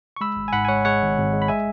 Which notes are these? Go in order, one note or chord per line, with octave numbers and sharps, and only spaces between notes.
C#6
G#3 B5 E6
G#1
G#5
G#2 F#5 B5
G#5
G#3 C#5 F#5
G#3 C#5 F#5
G#1
G#1
G#3
B5
G#3 E5 G#5